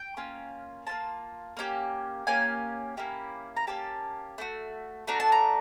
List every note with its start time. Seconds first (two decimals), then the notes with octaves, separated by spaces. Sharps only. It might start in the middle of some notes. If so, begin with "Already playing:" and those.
Already playing: G5
0.17 A#3 C#4 F4
0.87 A#3 C#4 F4 A5
1.57 A#3 C#4 E4 G4
2.27 A#3 C#4 G4 G#5
2.97 A#3 C#4 E4 G4
3.57 A#5
3.67 A#3 C#4 G4 A5
4.38 A3 D4 F#4
5.07 A3 D4 F#4 A#5
5.20 A5
5.32 A#5